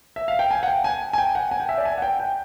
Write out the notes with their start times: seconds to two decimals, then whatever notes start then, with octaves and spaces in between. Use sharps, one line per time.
0.16 E5
0.28 F5
0.39 G5
0.51 G#5
0.63 F#5
0.68 G5
0.84 G#5
1.13 G#5
1.18 G5
1.35 F#5
1.51 G#5
1.60 G5
1.69 E5
1.78 D5
1.85 G#5
1.98 F#5
2.02 G5
2.20 G5